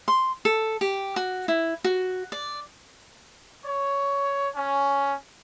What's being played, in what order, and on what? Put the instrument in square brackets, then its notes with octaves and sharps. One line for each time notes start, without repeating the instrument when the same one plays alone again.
[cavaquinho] C6
A4
G4
F#4
E4
F#4
D5
[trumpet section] C#5
C#4